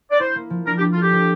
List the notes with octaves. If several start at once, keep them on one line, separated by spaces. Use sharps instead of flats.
D5
E4 C5
A#3
F3
D4 A#4
G4
D4
F4
G4 A4
F3